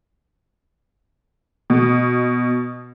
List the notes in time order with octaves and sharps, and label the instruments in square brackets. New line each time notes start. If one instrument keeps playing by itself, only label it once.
[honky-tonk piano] B2